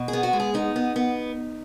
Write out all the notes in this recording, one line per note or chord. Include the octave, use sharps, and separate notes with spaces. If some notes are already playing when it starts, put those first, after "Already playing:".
Already playing: B2
G#4
B3
F#4
G#3
G#4
B3 D#4
B3
B3